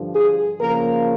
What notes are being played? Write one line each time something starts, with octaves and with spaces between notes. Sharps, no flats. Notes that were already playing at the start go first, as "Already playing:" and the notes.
Already playing: G2 D3 F3
G#4
C#3 F3 A#3 A#4